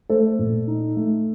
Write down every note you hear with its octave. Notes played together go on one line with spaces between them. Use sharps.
A3 A4 C5
A#2
D#4
A3